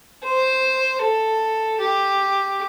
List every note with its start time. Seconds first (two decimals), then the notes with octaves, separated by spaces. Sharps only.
0.23 C5
1.01 A4
1.79 G4